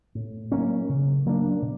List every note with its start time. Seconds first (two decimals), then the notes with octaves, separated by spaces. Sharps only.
0.15 A2
0.52 F#3 A#3 C#4
0.89 C#3
1.26 F#3 A#3 D4
1.62 B2